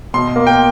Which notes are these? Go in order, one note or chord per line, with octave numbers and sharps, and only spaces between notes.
B2 C6
A#3
G5